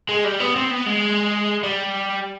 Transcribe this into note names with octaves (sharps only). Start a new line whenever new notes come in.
G#3
G3
B3
C4
B3
G#3
G3